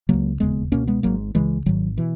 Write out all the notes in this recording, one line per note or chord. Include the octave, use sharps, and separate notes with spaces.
C#2 C#3 F#3 A#3
E1 D#2 C#3 G#3 B3
C#2 B2 A#3 C#4
G#3 B3
G#1 G#2 F#3 A#3
C#2 C#3 E3 G#3
G#1 G#2 D#3 F#3
B2 E3